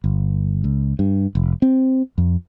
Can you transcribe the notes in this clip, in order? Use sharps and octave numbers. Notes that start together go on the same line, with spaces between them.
G1
C#2
G2
F1
C4
F2